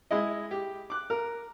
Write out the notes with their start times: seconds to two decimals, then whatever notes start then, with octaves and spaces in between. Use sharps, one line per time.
0.11 G#3 E4 D#5
0.51 G4
0.90 D6 F#6
1.10 A#4